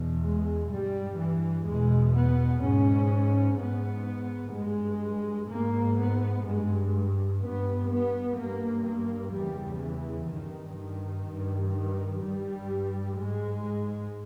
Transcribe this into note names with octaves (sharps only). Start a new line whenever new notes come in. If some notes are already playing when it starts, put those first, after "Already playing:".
Already playing: E2 B2
G#3
G2 G3
E3
E2 B2 G#3
B3
G#2 C#4
G#2 B3
G2 G#3
G#2 A#3
B3
G2 G#3
G2 B3
B3
G2 A#3
A#3
E2 C#3 G3
E3
G2 D#3
D#3
G2
D#3
G2 G3
G#2 G#3